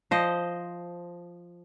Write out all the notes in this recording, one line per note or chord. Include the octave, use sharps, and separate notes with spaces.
F3 C5 D#5